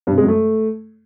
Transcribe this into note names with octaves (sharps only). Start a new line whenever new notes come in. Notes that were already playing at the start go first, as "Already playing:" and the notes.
G2
C3
G#3
F#2
A3